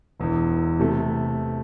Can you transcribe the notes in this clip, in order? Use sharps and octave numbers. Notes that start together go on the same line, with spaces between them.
E1 E2 E3
C3 A3